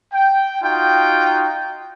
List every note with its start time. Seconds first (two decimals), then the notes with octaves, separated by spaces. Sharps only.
0.13 G5
0.62 D#4 F4 F#4 G5